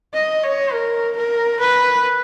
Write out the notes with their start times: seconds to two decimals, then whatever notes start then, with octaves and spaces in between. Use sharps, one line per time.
0.13 D#5
0.43 C#5
0.72 A#4
1.16 A#4
1.59 B4